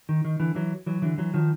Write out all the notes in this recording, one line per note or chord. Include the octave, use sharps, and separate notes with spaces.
D#3
D#3
D3 E3
E3 F#3
E3 F#3
D3 E3
E3 F#3
D#3 F3